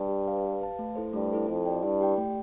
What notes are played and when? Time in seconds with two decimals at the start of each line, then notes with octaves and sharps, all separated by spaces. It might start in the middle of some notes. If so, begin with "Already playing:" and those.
Already playing: G2
0.08 G4
0.26 B4 F5 A5
0.43 G4
0.61 B4 F5 A5
0.79 A3
0.95 E4 A4 C5
1.13 G2 A3
1.31 E4 A4 C5
1.49 F2 E4
1.66 G4 D5 G5
1.83 G2 E4
2.01 G4 D5 G5
2.18 A3